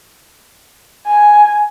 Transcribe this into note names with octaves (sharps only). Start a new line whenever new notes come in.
G#5